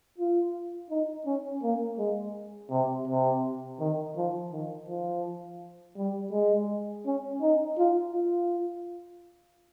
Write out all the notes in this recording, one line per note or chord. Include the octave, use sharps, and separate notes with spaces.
F4
D#4
C#4
A#3
G#3
C3
C3
D#3
F3
D#3
F3
G3
G#3
C#4
D#4
F4
F4